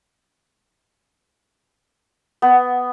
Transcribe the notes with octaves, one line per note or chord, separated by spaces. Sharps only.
B3